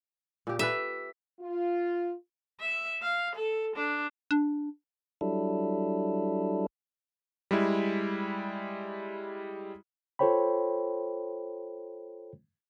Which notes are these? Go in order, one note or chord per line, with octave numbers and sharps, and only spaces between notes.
A#2 G4
G4 A4 B4 E5
F4
E5
F5
A4
D4
D4
F#3 G3 D4 E4 A4
G3 G#3 E4
F4 A4 C5 C#5 G5 B5